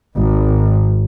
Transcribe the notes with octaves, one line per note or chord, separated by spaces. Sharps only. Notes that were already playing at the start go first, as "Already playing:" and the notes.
G#1